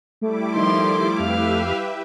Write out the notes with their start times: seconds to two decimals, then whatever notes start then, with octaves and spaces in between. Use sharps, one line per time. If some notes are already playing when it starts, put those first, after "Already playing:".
0.21 G3 A3 E4 D6
0.56 D#3 F3 C6
1.20 F2 G4 B4 E5 F5